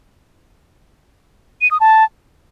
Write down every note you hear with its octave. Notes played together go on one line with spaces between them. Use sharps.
D#7
D#6
A5